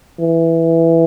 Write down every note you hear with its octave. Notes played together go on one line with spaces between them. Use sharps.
E3